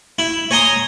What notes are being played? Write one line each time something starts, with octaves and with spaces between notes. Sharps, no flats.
E4
C#5 G#5 A#5 C6 D#6